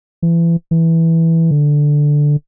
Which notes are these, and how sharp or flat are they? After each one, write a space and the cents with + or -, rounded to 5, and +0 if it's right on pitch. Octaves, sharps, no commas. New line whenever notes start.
E3 +30
E3 -5
D3 +0